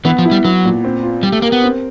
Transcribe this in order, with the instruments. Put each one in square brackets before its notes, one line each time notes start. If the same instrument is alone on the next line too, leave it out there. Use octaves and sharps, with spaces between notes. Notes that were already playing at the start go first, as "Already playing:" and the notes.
[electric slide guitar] E3 [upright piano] B3
[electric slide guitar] F3
[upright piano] E4
[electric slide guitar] G3
[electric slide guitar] F#3 [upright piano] B3
[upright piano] A#2
C4
F4
[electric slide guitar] G3 [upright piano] G4
[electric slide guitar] A3
[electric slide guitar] A#3 [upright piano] A#4
[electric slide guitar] B3
[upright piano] C4